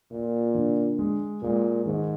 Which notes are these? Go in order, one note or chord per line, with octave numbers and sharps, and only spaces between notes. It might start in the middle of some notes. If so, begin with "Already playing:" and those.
A#2 F4
D3
G#3
A#2 G#3
G#2 D#3